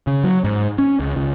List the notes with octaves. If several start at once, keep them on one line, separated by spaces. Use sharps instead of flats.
C#3
F#3
G#2
C#4
C#2
C#2